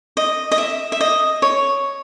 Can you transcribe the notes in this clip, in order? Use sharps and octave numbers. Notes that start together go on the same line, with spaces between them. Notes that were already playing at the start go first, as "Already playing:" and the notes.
D#5
D#5
E5
E5
D#5
C#5